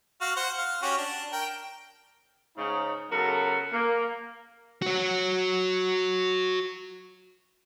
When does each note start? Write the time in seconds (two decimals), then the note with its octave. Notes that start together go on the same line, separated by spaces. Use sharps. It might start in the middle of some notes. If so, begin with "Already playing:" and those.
0.21 F#4 F5
0.36 C5 F#5
0.58 F5
0.82 C#4 F#4 G4
0.98 D4
1.33 A#4 G5
2.56 G#2 C#3 D#4
3.10 C#3 F#3 B3 F#4 A4 A#4
3.73 A#3
4.82 F#4 C#5